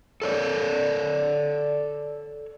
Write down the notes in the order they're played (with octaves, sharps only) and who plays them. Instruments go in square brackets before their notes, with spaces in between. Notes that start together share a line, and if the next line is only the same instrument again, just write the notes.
[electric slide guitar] A4 C#5 D5